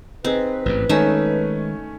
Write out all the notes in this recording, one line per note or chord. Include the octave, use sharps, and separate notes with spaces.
C4 D#4 G#4 B4
A1 G#2
D#3 G#3 A3 C#4 D#4 E5 G#5